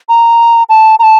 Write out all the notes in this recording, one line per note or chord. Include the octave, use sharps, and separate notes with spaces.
A#5
A5
A#5
A5